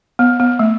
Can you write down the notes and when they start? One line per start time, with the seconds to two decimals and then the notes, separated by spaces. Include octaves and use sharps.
0.19 B3
0.40 B3
0.59 A3